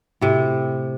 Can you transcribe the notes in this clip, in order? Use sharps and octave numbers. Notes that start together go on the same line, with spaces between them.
A2 C3